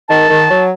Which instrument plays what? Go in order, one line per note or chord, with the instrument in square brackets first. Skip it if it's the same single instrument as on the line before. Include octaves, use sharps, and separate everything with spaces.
[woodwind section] D#3 [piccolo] A5
[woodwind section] D#3
F#3